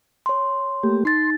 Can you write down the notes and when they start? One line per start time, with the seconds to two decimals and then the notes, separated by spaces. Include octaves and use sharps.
0.26 C#5 C6
0.83 A3 A#3 G4
1.05 D#4 C6 A6